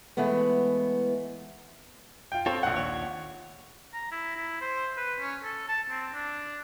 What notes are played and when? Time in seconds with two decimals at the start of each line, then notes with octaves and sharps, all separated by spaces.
0.17 E3 G#3 A3 B3
2.32 F4 G5
2.46 C4 F4 A4 C#5
2.63 A#1 F#5
2.76 D#2 C#5
3.94 A#5
4.12 E4
4.36 E4
4.61 C5
4.97 B4
5.20 C#4
5.44 A4
5.68 A5
5.90 C4
6.14 D4